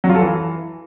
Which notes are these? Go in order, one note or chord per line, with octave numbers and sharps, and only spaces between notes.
F#3
F4
A4
E3